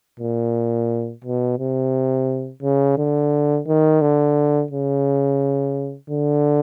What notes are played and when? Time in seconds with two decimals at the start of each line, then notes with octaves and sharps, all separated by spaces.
0.20 A#2
1.24 B2
1.59 C3
2.63 C#3
2.98 D3
3.67 D#3
4.01 D3
4.71 C#3
6.10 D3